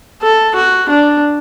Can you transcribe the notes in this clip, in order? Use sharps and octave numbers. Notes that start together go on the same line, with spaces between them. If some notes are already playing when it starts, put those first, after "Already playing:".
A4
F#4
D4